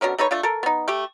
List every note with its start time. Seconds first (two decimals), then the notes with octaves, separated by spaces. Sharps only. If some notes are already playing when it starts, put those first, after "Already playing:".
0.01 B2 D3 C#4 A#4
0.18 A3 D#4 B4 C#5
0.31 A3 D4 F4
0.43 A4 A#4
0.63 B3 D#4
0.88 A3 G4